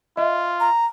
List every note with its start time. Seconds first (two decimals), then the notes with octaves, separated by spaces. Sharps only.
0.17 F4 D#5 E5
0.60 A#5